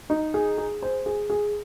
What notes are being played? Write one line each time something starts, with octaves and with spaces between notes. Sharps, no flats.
D#4
G#4
G#4
C5
G#4
G#4